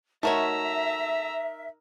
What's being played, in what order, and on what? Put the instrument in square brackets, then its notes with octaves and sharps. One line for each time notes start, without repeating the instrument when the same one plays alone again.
[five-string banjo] A3 F#4 C#5 [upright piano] D#4 A#4 [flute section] E5 [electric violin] A#5 E6